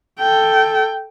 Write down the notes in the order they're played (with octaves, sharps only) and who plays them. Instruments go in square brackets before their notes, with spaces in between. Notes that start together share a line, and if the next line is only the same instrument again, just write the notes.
[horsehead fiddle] A4 G5